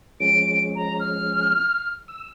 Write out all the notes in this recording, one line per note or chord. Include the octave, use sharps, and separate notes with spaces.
F3 G#3 C#4 D7
A#5
F6
E6